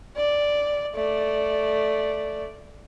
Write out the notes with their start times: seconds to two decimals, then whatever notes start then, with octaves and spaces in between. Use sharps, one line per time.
0.16 D5
0.95 A3 D5